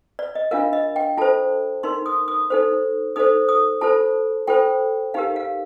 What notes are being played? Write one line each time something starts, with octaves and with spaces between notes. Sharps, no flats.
D5
D#5
D4 F4 A#4 F5
D#5
G5
F4 A4 C5 A5
D#4 A#4 C6
D#6
D#6
D#4 A4 C5
D#4 A4 C5 D#6
D#6
F4 A4 C5 A5
F4 A4 C5 G5
D#4 G4 A#4 F5
F5